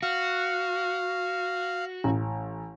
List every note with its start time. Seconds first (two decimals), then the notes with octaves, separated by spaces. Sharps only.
0.03 F#4 F5
2.04 A1